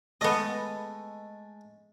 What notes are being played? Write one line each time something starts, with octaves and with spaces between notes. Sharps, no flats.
G#3 A3 B3 A4 D#5